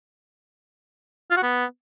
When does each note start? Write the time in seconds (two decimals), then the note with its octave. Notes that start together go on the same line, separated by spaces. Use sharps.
1.31 F4
1.37 F#4
1.43 B3